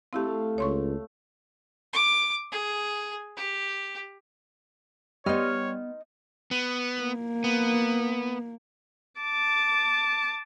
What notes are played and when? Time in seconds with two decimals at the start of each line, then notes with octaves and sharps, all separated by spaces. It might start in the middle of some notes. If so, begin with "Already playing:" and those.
0.13 A3 C4 E4 G4 F5
0.58 C#2 C#5 C6 C#6
1.93 D6
2.52 G#4
3.36 G4
5.26 G3 B3 D#4 C#5 D#5 C6 F6
6.51 B3
7.01 A#3
7.44 B3
9.21 A5 D6